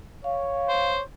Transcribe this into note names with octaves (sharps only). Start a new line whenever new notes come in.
C#5 F5
C5